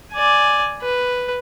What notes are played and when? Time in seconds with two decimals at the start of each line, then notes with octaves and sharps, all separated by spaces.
0.13 D5 G#5
0.82 B4